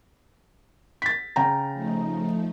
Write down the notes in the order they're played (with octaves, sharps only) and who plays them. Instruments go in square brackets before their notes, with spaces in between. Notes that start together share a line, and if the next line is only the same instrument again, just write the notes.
[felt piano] A6 B6
C#3 G5 A#5
[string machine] F3 A3 D#4